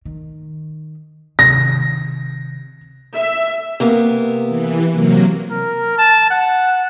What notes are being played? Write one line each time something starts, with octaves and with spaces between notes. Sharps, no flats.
D#3
C3 D#3 A#6
E5
C3 A#3 B3
E3
C3 F#3 A#3
A#4
A5
F#5